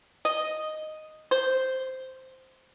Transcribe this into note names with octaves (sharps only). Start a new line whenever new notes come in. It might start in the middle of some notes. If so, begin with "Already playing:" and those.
D#5
C5